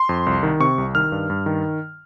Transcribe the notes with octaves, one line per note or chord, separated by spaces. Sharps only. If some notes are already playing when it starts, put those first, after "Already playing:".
Already playing: C6
F2
C2
D#3
C3 C#6
C2
D#3 F6
G2
G2
D#3